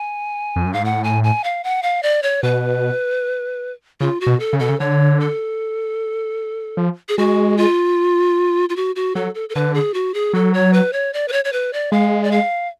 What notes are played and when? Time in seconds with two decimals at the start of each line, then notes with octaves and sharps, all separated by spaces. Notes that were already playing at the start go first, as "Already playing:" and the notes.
Already playing: G#5
0.56 F2
0.65 F#2
0.73 G#2 F5
0.84 A2 F#5
1.04 G#5
1.24 G#5
1.44 F5
1.64 F#5
1.83 F5
2.03 D5
2.23 C#5
2.43 B2 B4
4.00 C#3 F4
4.20 F#4
4.27 B2
4.40 A4
4.53 C#3
4.60 B2 A4
4.69 C#3
4.80 D3 C#5
5.20 A4
6.77 F3
7.09 G#4
7.18 G#3 F#4
7.57 F4
8.69 F4
8.76 F#4
8.96 F#4
9.15 F#3 A4
9.35 A4
9.49 A4
9.55 D3 B4
9.74 G#4
9.94 F#4
10.14 G#4
10.33 F#3 A4
10.54 C#5
10.73 B4
10.93 C#5
11.13 D5
11.28 B4
11.32 C#5
11.45 C#5
11.53 B4
11.73 D5
11.92 G#3 F5
12.23 D5
12.32 F5